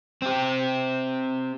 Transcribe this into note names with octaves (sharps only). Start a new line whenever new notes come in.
C4 G4